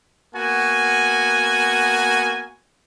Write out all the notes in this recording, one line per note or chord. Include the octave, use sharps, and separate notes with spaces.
A#3 B3 F#4 G#5